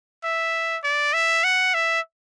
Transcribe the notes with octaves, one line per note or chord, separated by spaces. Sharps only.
E5
D5
E5
F#5
E5